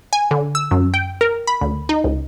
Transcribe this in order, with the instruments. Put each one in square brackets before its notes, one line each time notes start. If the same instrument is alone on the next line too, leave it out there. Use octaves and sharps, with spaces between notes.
[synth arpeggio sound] G#5
D3
E6
F#2
G5
A#4
B5
D2
D#4
C#2